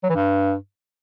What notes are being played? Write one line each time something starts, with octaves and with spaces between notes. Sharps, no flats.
F#3
E3
G2